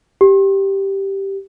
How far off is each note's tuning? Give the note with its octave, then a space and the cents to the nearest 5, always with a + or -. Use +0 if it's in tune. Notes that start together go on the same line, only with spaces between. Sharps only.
G4 -5